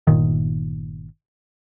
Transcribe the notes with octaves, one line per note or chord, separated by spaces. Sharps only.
G1 A#2 D#3